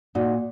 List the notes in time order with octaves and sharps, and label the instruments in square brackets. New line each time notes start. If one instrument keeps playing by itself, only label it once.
[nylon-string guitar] A#2 D#4 F#4